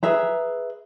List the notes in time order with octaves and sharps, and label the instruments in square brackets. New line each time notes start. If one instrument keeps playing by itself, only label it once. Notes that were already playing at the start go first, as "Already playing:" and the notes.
[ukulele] G#4 B4 E5 A#5